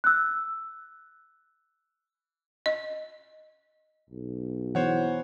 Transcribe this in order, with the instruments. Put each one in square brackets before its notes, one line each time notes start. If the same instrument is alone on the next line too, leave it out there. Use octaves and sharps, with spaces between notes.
[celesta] E6 F#6
[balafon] D#5
[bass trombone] B1
[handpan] E3 B3 [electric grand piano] C5 C#5 F#5